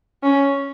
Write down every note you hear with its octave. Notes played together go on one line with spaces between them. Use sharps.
C#4